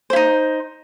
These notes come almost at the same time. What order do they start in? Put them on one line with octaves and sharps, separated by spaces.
C5 E4 D#4